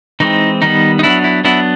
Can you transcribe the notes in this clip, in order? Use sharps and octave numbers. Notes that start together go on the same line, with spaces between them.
E3 G#3 C4 D#4
D#3 G3 B3 D#4
D#4
F#3 B3 D4 E4
E4
F#3 B3 D4 E4